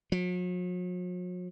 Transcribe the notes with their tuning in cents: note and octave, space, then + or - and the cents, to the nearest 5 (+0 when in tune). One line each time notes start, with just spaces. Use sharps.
F#3 -45